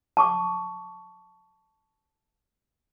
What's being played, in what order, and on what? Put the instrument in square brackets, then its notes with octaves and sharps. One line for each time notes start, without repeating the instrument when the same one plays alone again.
[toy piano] A5 C#6 D6